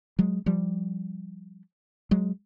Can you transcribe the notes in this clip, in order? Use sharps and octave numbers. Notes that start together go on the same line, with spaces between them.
F#3 G#3
F3 G3
F#3 G#3